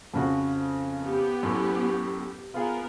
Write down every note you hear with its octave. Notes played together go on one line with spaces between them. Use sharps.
F2 C#3 F#4
B3 G4
F#2 A2
B3 F4 G#4 A#4